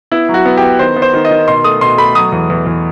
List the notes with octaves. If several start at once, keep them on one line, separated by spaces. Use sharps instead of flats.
B3 E4
F#3
F#4
B3
G4
B3
D#3 C5
B3
C5
D#3
D#5
D#3
B2 C6
A3 D#6
B2 C6
A3 B5
F#3 D#6
E2
E2
E2